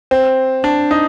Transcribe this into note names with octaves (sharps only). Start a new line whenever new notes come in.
C4
D4
D#4